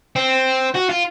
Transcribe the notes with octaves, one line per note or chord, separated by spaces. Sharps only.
C4
F#4
F4